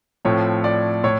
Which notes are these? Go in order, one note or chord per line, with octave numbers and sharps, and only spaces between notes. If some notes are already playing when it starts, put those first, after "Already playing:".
A2 F3 A3 C4 C#5
D5
A2 C#5